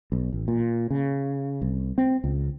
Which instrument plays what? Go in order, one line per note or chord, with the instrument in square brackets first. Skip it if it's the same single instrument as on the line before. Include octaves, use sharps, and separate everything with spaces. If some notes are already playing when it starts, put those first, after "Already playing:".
[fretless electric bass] B1
A1
A#2
C#3
C2
C4
C#2